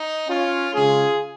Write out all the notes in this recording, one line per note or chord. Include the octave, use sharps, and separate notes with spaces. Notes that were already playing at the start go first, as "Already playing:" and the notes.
Already playing: D#4
C#4 F4
C#3 G#3 C#4 F4 G#4